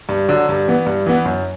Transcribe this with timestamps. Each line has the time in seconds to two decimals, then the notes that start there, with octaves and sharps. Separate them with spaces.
0.09 G2
0.29 D3 F#3
0.49 G2
0.68 E3 B3
0.86 G2
1.07 E3 B3
1.25 F#2